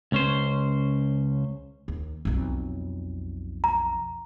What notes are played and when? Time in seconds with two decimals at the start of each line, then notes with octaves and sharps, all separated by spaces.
0.12 C#2 C#4 C5
1.88 D#2
2.25 B1 F2
3.64 A#5